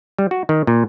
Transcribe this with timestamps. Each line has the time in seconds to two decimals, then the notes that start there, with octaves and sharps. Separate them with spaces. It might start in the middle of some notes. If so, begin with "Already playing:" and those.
0.19 G3
0.31 F#4
0.49 D#3
0.67 A#2